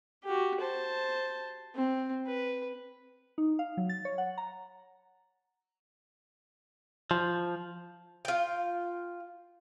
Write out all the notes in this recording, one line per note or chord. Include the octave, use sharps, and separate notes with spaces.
F#4 G4
C5 A5
C4
B4
D#4
F5
F#3
A6
C#5
F#5
A#5
F3
F4 G5